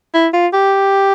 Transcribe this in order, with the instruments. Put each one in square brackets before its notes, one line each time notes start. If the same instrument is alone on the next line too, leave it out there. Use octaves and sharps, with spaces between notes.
[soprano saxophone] E4
F4
G4